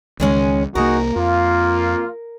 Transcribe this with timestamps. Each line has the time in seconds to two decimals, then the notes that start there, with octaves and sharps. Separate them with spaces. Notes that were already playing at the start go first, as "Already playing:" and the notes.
0.20 C#2 D#3 G#3 C#4
0.75 C2 E3 A#3 D#4 F#4 G#4 A#4
1.16 F2 A#3 F4